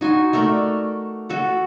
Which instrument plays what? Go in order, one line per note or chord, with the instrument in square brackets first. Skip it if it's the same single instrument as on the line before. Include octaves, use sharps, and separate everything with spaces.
[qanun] D#4 F#4 G#5 C6
A3 A4 A#4 D5
F#4 A4 F#5